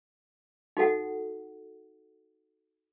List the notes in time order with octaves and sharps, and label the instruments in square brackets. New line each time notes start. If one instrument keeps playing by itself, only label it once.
[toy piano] D#4 F#4 A4 F#5